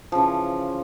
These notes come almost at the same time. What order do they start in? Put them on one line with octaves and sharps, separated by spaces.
F3 C#3 E3